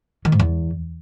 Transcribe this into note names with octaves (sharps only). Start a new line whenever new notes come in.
D#3
G#2
E2